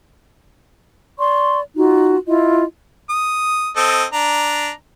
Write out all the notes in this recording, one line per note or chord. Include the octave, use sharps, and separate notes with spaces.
D5 C6 C#6
D#4 F4 F#4
E4 F4 D#5
D#6
C4 A4 D#5
D4 A#5